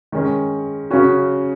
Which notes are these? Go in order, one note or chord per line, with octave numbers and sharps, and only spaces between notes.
D#3 G#3 C#4
C#3 F#3 C#4 F#4